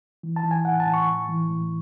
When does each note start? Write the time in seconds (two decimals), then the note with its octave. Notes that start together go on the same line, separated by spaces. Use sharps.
0.23 E3
0.36 A5
0.43 E3
0.51 G#5
0.65 A2 F#5
0.80 A5
0.86 A2
0.94 C#6
1.08 A2
1.29 E3
1.50 A2